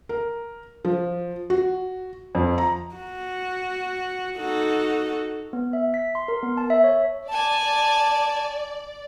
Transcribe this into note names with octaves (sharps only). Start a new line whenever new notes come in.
A#4
F3
F#4
F2
A#5
F#4
D#4 F#4 A4
B3
E5
B6
C6
A#4
B3
A5
E5
C#5
D5 G#5 A5